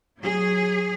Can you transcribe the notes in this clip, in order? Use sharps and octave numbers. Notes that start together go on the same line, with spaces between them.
F#3 G#4